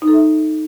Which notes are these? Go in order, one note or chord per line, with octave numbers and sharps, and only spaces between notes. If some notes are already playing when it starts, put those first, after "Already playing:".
D#4
A4
E5